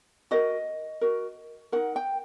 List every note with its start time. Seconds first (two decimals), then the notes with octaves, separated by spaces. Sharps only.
0.31 F#4 A#4 D#5
1.01 F#4 A#4
1.72 D#4 F#4 A#4 F#5
1.96 G5